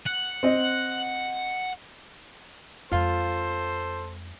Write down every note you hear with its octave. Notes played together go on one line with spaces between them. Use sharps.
F#5
C4 D#5
F2 G#3 F4 A4 C5 F5